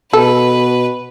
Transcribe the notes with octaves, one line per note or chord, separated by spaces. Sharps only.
B2 A4 B4